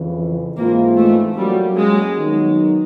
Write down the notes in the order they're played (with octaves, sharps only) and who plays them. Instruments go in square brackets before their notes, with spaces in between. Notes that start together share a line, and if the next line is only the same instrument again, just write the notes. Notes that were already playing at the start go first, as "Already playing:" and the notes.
Already playing: [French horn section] F2 C#3 E3
[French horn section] G#2 E3 G#3 C4 F4 [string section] A#3
[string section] A3
[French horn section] F#3 A#3 C#4 F#4 [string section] G3
[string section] G#3
[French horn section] D#3 F#3 B3 D#4